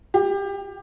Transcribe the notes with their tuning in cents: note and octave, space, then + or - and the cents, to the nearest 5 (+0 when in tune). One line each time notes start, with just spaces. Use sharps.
G4 +25